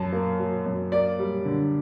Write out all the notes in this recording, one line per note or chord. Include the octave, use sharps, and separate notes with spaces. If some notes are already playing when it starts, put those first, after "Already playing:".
Already playing: F#2 A5
A#3
F#3
F#2
A#3 D5
G3
D3